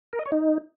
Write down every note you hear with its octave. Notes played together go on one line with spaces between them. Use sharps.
A#4
D#5
C#5
D#4